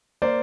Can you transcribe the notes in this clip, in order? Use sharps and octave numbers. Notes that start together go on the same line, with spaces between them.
A#3 C5 D5